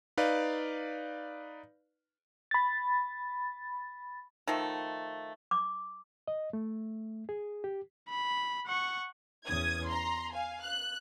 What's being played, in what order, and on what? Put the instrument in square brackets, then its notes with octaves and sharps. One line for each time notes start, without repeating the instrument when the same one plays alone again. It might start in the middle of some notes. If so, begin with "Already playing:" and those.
[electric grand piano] D#4 B4 D5 F5
[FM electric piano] B5 A6
[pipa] D#3 F3 A3
[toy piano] D6
[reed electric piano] D#5
A3
G#4
G4
[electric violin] B5
F#5 C#6
[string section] E2 C#4 D#6 G#6
A#5 C6
F5 G#5
F#6